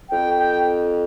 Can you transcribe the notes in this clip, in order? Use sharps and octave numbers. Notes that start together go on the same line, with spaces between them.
F2 G5
G5